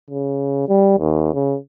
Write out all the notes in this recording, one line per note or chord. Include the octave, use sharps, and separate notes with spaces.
C#3
G3
D#2
C#3